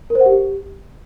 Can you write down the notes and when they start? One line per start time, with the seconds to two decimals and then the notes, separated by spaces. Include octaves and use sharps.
0.10 A#4
0.15 C5
0.20 F#5
0.26 G4